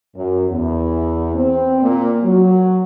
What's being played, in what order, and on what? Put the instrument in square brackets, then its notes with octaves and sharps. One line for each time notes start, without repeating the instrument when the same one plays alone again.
[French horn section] F#2
E2
C4
A#2
F#3